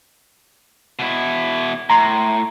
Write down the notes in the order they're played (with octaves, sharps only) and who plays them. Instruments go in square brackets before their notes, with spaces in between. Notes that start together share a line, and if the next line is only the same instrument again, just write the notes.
[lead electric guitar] B2 E4
[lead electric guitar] A2 [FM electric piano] A#5 C6